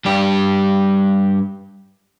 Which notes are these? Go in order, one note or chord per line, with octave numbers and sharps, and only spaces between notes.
G2 G4